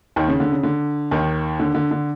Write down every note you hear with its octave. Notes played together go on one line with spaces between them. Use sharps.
D#2 D#3
C#3
D3
C#3
D3
D#2 D#3
D3
D3
D3